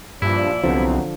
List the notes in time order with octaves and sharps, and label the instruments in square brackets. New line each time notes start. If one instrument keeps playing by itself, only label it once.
[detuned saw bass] G2 [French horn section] A#2 F3 D5 [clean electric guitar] E4
[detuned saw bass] C2 [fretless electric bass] D3 F3 [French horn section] F#3 B3 C4